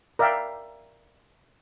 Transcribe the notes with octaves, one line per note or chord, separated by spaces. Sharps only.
A#4 D5 E5 F5 G5